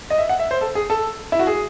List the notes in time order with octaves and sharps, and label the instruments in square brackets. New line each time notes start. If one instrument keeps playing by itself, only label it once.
[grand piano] D#5
E5
F#5
E5
C5
A4
G#4
A4
E4
F#4
G#4